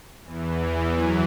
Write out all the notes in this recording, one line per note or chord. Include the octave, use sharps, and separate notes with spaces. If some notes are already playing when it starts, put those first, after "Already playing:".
E2 E3
F#2 F#3